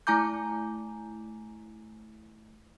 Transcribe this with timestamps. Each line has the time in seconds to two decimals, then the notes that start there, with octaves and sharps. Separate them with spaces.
0.07 A3 E4 G#5 A#5 D6 G6